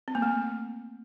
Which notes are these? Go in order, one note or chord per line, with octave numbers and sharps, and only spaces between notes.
C4
A#3
A3